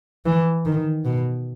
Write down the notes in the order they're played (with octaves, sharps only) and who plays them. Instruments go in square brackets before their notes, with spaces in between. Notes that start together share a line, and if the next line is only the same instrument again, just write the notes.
[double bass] E3
D#3
B2